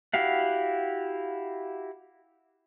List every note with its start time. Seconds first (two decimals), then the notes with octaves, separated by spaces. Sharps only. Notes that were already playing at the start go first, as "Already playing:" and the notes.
0.14 E4 F#4 G4 F5 F#5